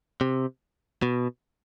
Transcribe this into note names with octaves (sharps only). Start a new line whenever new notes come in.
C3
B2